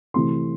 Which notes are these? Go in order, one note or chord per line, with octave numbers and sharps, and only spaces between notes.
C3 E3 A3 C6